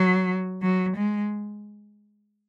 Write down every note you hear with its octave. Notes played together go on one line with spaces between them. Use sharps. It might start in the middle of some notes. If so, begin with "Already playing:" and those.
Already playing: F#3
F#3
G#3